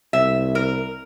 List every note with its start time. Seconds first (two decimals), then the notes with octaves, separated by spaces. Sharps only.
0.13 C2 E5
0.55 A#4